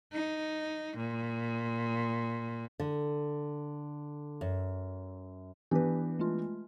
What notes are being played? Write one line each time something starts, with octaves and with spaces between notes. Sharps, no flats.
D#4
A#2
D3
F#2
E3 B3 D4 G4 B4
G#3 A3 F4